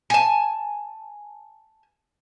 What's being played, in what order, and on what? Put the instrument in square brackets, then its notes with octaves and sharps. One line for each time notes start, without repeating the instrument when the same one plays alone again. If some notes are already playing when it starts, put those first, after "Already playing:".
[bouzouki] G#5 A5